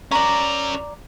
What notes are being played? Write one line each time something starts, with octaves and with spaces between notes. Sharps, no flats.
C#4 A#4 D5 A#5